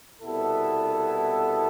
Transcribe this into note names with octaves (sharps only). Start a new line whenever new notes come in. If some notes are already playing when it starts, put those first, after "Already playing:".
C2 B2 B3 E4 A4